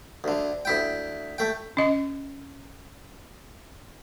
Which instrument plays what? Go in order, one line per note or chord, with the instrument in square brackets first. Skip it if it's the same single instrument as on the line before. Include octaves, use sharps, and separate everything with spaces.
[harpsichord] D2 D3
D2 E4 G5
A3 G5
[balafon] C#4 D#5